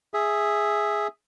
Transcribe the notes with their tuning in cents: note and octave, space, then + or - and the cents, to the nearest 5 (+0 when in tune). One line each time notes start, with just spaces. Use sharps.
G#4 +0 E5 +0